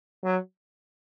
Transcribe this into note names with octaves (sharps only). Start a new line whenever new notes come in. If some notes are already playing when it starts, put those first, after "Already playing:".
F#3